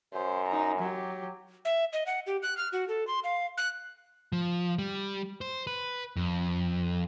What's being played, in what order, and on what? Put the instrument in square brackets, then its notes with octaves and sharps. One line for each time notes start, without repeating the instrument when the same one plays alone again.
[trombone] F#2 [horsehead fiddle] C5
[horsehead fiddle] D#4 A#5
F#3 G4
[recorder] E5
D#5
F#5
G4
F#6
F6
F#4
A4
C6
F5
F#6
[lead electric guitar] F3
G3
C5
B4
F2